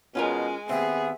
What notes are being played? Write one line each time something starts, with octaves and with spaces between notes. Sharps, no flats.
B2 G#3 C#4 F4 A#4 G#5
D#2 B3 C4 G#4 E5